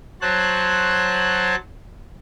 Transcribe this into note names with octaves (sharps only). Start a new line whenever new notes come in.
F#3 C5 C#5 A5 F#6